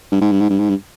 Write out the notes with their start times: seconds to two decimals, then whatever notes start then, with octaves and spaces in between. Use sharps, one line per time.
0.12 G2
0.21 G#2
0.32 G2
0.40 G#2
0.50 G2
0.59 G#2
0.69 G2